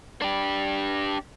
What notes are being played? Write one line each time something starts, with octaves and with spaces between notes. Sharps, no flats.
D4 G4